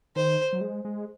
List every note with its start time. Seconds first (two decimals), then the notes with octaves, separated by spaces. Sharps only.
0.16 D#3 C5
0.53 F#3
0.61 G#3
0.85 G#3